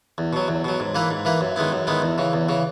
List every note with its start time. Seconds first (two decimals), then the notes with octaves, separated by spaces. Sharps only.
0.18 E2
0.33 B2 F#3
0.48 E2
0.64 B2 F#3
0.80 G#2
0.95 E3 A#3 E4 B4
1.11 G#2
1.25 E3 A#3 E4 B4
1.41 F#2
1.56 D#3 G#3 B3 E4
1.72 F#2
1.87 D#3 G#3 B3 E4
2.02 E2
2.18 C#3 E3
2.33 E2
2.49 C#3 E3